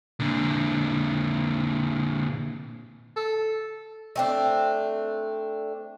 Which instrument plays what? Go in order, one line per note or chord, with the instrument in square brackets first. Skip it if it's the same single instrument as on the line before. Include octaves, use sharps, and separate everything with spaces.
[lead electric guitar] A#2 D3
[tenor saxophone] A4
[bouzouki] A3 C4 D4